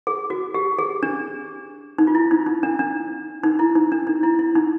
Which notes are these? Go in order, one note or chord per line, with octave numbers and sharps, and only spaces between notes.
G#4
F#4
G4
G#4
D4
D#4
F4
E4
D#4
D#4
D4
D4
D#4
E4
D#4
D4
D#4
E4
E4
D#4